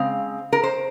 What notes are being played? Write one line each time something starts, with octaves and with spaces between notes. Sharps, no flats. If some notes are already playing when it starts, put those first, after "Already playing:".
Already playing: C#3 G#3 C4 F5
A#4
C5